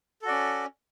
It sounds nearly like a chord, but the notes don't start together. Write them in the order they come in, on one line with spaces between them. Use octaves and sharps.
A4 F#4 D5 C#4